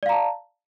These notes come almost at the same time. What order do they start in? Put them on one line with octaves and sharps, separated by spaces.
D5 F5 A#5 A5